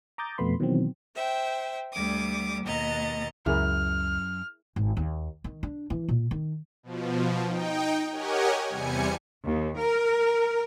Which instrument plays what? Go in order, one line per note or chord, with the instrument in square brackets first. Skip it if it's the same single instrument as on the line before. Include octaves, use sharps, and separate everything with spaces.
[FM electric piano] A#5 D6 D#6 G6 A6
F2 B2 A3 B3 B5 C6
B2 D#3 E3 F#3 B3 C4
[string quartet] C5 E5 G5
D2 G3 D6 D#6
D#2 B2 D#5 A#5 A6
[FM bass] C#2 [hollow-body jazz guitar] F#2 [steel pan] E4 G#4 A#4 [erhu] F6
[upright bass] G#1
D#2
D#3
D4
E3
A#2
D#3
[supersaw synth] B2 F3
D#4 G5
G4 A#4 C#5 D#5 F#5 G#5
E2 C3 G3 G#5 C#7
[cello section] D#2
A#4